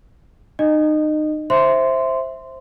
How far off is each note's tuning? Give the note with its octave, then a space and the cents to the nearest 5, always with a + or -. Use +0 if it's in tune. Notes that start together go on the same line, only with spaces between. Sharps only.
D#4 -30 D#5 -20
C5 +10 E5 +0 C6 -15